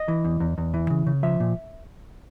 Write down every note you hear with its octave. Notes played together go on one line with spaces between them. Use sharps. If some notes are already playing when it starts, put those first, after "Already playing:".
Already playing: D#5
E3
E2
E2
E2
E3
C#3
C#3
F3 E5
A#2